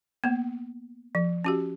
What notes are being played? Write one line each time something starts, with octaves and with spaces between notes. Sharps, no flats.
A#3 B3
F3
C#4 F#4 G4